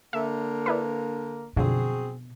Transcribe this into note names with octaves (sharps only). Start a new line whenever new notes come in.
D3 A#3 E5
D4 E4 B4
F#2 B2 D3 F3 C4 F#4 G#4